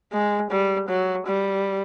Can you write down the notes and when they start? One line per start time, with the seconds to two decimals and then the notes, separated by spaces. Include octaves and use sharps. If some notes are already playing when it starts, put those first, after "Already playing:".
0.13 G#3
0.51 G3
0.89 F#3
1.27 G3